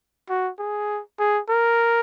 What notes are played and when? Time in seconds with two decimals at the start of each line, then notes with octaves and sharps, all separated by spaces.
0.29 F#4
0.59 G#4
1.19 G#4
1.49 A#4